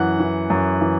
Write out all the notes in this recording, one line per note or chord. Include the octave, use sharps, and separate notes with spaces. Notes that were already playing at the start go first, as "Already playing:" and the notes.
Already playing: F#2 E3 F#5
E3
F#2
E3